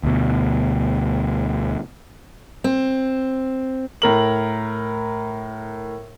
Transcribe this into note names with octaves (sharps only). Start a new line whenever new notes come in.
D2 B2
C4
A2 A#4 F#7